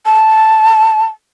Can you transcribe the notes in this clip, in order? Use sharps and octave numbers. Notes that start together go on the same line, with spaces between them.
A5